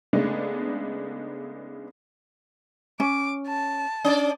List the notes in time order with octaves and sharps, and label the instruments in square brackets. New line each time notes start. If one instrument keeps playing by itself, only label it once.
[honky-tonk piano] C#3 G#3 A3 B3 D4 D#4
[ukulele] C#4 [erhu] D6
[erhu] A5
[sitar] C#4 D5